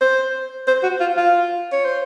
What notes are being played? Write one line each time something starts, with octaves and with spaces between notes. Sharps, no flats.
C5
C5
F#4
F4
F4
C#5
C5